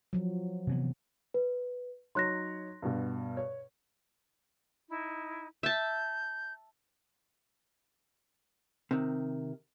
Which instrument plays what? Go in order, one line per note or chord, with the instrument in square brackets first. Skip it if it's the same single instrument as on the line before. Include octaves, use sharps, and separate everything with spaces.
[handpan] F3 F#3
[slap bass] C3 E3 B3
[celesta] B4
[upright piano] F#3 D#4 C#5 [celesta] C6 F#6 A#6
[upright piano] G2 B2
C#5
[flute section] D#4 E4
[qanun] E5 A5 [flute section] G6
[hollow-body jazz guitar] C3 D#3